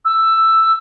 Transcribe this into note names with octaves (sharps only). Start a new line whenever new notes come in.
E6